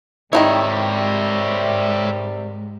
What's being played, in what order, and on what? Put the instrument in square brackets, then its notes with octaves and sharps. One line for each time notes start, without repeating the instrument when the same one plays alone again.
[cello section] G#2 [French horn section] C3 G3 [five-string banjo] D#3 F#3 E4 [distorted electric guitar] C#5 E5